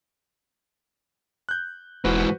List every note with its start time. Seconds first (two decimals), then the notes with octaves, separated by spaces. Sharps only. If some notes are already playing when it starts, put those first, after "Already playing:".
1.49 F#6 G6
2.05 E1 G#2 E3 F#4 B4 C5